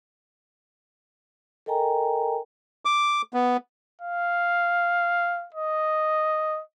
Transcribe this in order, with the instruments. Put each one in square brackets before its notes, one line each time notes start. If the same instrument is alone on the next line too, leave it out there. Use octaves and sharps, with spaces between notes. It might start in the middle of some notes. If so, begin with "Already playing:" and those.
[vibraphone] A4 A#4 D#5 G5 G#5 A#5
[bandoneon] D6
B3
[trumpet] F5
D#5